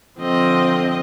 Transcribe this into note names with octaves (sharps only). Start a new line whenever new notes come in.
D3 F3 C4 D#5